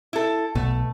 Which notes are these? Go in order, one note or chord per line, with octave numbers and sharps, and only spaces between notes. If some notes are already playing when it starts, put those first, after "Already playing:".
E4 A4
B1 B2 A3